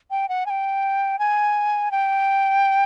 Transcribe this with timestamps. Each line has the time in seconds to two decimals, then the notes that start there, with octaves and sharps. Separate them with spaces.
0.11 G5
0.29 F#5
0.46 G#5
0.50 G5
1.19 G#5
1.91 G5